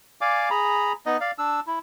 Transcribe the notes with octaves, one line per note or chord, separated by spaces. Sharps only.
D5 F5 G#5 D6
G#4 A#5 B5
B3 D#4 D#5
D5 F5
D4 E6
E4